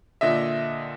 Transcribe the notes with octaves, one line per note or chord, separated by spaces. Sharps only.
A#2 D3 D#5 E5